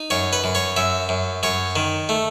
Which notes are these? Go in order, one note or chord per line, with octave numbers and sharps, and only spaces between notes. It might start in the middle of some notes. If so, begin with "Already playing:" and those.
Already playing: D#4
F#2 C#5
B4
F#2
C#5
F#2 E5
F#2
F#2 C#5
D#3
A3